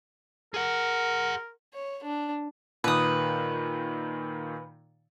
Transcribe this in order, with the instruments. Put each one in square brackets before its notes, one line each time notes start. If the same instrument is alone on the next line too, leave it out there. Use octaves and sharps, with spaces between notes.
[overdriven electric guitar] G#4 F#5 [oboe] A#4
[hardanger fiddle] C#5
D4
[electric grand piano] A#2 D#3 [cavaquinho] B4 D#6